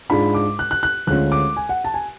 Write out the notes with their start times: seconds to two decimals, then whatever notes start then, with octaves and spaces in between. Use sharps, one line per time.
0.10 G#2 G#3 D4 F4 B5
0.34 D6
0.59 F#6
0.71 F#6
0.83 F#6
1.07 D2 D3 G#3 C#4 F4 F#6
1.32 D6
1.57 G#5
1.69 F#5
1.84 A5
1.94 G#5